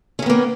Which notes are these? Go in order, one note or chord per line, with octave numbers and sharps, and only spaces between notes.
D#3 A#3 B3 C#4